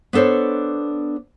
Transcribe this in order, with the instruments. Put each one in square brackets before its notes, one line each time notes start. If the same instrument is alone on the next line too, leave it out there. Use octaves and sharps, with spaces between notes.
[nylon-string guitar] B3 D4 A4 C5 C#5